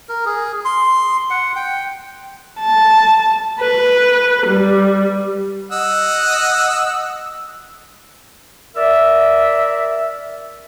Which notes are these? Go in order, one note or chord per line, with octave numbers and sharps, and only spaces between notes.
A#4
G#4
C6
F#5
G5
A5
B4
G3
D#5 F#5 E6
A#4 D5 E5